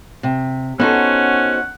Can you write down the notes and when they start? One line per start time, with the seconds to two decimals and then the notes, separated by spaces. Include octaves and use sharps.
0.23 C3
0.80 B3 C#4 D#4 F#4 A4 C5 F#5